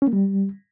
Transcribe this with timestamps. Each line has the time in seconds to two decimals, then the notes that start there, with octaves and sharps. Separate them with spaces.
0.02 C#4
0.07 A#3
0.13 G3